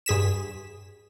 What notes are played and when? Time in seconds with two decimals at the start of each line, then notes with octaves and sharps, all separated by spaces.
0.06 G2 G#4 B6 E7